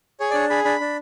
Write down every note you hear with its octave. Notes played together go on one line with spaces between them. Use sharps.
G#4 C#5
D5
D4 C#5
G#4 B5
D4 B5
D4